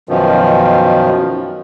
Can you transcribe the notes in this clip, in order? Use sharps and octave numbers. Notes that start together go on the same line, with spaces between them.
F#2 B2 D#3 F3